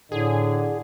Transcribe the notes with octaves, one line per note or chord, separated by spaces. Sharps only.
A2 D3 G#4